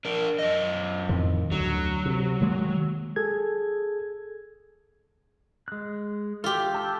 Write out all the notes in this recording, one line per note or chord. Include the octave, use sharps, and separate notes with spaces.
D4 A#4
F#2 D#5
F2 A2 D#3
D2 D3 F#3
C3
D#3 G#3 A#3
G#4 A4 G#6
G#3 F#6
F4 G4 A4
A5 D6 E6